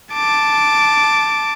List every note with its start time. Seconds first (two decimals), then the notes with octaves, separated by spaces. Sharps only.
0.14 A5 D6